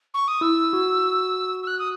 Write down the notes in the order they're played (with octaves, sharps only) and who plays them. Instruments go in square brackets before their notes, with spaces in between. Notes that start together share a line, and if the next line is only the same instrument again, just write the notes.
[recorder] C#6
D#6
[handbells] E4 [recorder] E6
[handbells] F#4
[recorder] E6
F#6
D#6